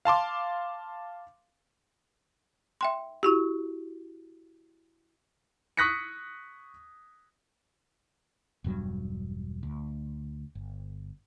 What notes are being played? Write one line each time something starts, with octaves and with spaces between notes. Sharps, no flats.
F5 A5 C6 D6
E5 G5 C6
E4 F#4 G4
C#6 D#6 F#6 A#6 B6 C#7
E1 G2 F#3 G3
D2
G1